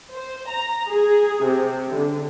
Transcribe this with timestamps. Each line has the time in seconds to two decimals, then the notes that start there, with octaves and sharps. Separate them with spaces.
0.13 C5
0.49 A#5
0.90 G#4
1.44 C3
1.94 D3